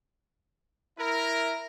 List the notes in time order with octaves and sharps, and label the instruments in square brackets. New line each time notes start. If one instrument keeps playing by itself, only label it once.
[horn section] E4 A#4